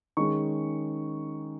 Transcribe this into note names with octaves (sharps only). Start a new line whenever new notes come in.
D#3 G#3 C#4 C#6